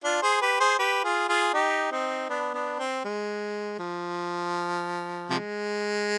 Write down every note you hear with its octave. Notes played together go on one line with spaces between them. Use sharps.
D4 F4
G#4 C5
G4 B4
G#4 C5
G4 B4
F4 G#4
F4 G#4
D#4 G4
C4 D#4
B3 D4
B3 D4
C4
G#3
F3
C3 F3 G#3